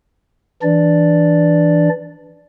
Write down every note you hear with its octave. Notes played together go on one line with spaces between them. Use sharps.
E3 D4 D5